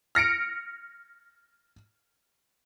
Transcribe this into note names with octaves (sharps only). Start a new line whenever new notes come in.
F6 A#6 C#7 D7